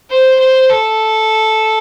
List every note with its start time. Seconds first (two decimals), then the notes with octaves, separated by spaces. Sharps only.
0.10 C5
0.40 C5
0.69 A4